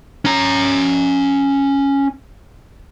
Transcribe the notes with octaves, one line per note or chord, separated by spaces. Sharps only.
C#4 A#5